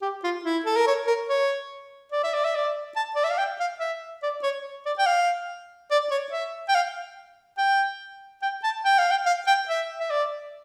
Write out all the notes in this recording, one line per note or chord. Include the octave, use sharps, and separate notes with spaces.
G4
F4
E4
A4
A#4
C#5
A#4
C#5
D5
E5
D5
E5
D5
A5
D5
E5
F5
G5
F5
E5
D5
C#5
D5
G5
F5
D5
C#5
E5
G5
F5
G5
G5
A5
G5
F5
G5
F5
G5
E5
E5
D5